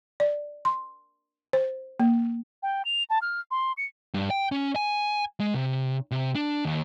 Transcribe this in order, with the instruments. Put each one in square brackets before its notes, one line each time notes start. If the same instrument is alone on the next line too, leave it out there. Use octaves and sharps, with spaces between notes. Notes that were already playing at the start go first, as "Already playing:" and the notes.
[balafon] D5
C6
C5
A#3
[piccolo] G5
F7
A5
F6
C6
C#7
[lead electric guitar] G2
G5
C#4
G#5
G#3
C3
C3
D4
D#2